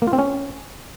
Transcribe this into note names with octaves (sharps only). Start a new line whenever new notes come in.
A#3
F4
C4
C#4